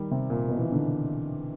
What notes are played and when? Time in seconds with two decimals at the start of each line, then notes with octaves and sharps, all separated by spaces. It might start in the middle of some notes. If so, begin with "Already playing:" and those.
Already playing: D#3 G3
0.11 C3
0.30 A#2
0.49 B2
0.58 E3
0.65 D#3
0.72 D3